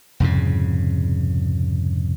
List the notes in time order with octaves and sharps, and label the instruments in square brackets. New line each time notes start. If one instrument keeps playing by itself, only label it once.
[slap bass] C2 F2 G#2 C#3